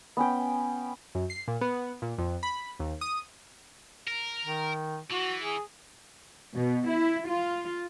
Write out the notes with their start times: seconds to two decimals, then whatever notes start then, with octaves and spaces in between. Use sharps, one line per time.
0.17 B3 C#4 G5
1.15 F#2
1.30 C7
1.48 A#2
1.61 B3
2.02 A#2
2.18 F2
2.43 B5
2.80 D#2
3.01 D#6
4.07 A#4
4.46 D#3
5.11 E3 F#4
5.41 G#4
6.54 B2
6.87 E4
7.27 F4